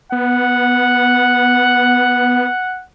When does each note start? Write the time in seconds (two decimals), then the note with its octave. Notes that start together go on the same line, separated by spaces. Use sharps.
0.12 B3 F#5